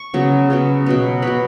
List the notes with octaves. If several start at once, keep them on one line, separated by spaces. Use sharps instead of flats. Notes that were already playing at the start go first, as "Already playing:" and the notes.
Already playing: C#6
C#3 F#3 B3
C#3 F#3 B3
B2 F#3 B3
B2 F#3 B3 B5